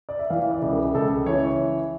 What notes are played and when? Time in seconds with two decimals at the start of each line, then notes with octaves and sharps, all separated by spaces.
0.09 D5
0.19 E5
0.30 E3 F5
0.51 D5
0.62 C#2
0.73 A#4
0.95 C#2 A4
1.26 E3 C#5